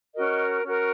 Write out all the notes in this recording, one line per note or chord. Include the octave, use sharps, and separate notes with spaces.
C#4 F#4 A#4 D#5
C#4 F#4 A#4